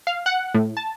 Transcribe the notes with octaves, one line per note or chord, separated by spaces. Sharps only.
F5
F#5
A2
A5